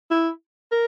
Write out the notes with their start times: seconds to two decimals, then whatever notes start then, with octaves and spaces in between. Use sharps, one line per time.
0.11 E4
0.72 A#4